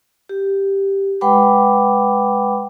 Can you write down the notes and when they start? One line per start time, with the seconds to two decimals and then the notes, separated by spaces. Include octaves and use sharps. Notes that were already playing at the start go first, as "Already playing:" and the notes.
0.29 G4
1.21 G#3 B4 F#5 G5 B5 D6